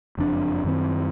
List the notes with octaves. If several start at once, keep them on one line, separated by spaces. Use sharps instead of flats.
F#1 F2 G#2 D4
F#2 D#3 C4